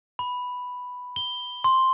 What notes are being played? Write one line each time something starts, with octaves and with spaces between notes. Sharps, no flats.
B5
G7
C6